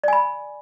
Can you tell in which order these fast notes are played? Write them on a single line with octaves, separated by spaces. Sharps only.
D5 G#5 B5